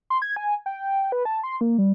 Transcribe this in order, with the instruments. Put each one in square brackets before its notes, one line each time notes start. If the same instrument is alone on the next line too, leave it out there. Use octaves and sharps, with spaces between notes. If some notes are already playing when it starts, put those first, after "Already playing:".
[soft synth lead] C6
G#6
G#5
G5
B4
A5
C6
A#3
G3